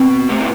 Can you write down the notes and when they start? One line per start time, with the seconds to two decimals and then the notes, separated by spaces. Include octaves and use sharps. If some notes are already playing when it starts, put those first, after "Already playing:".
Already playing: B2 C4
0.29 C3 A3
0.39 A2